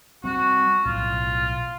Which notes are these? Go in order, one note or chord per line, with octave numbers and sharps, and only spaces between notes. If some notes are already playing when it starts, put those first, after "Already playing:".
G3 C4 F#4
B1 A2 F4